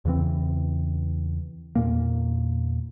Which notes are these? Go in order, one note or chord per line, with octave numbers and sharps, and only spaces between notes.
E2 C#3 E3 C4
E2 A#2 A#3